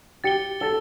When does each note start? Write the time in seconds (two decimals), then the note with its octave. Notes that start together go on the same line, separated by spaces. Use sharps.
0.24 G4 A6 C#7 G7
0.60 A4 A6 C#7 G7